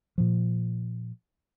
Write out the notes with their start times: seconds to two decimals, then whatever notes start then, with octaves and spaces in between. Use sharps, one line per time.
0.18 A#2 F3